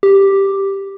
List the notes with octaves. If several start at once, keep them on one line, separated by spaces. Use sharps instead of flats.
G4